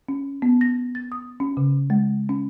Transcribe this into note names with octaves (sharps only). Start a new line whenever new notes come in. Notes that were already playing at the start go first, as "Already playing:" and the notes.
C#4
B3
A#6
A6
D#6
C#4
C#3
G#3
C#4